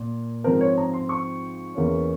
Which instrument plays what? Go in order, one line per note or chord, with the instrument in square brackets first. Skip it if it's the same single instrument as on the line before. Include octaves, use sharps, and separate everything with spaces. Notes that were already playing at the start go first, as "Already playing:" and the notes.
Already playing: [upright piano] A#2
G#2 F3 C4 A#4
C#5
A#5
C6
C#6
E2 E3 A#3 C#4